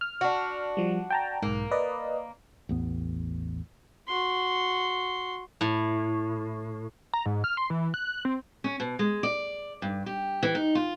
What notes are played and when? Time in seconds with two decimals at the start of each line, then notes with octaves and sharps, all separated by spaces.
0.01 F6
0.21 D4 F#4
0.77 F3 G3
1.10 G5 A5 A#5
1.42 B1 G#2 A#3
1.71 B4 D5 D#5
2.69 A1 E2 B3
4.08 F#4 C6
5.61 A2
7.14 A#5
7.26 G#2
7.44 F6
7.57 C6
7.70 E3
7.94 F#6
8.25 C4
8.64 C#4
8.80 B2
8.99 G#3
9.23 D5
9.82 G2
10.06 G4
10.43 E3
10.55 D#4
10.75 F4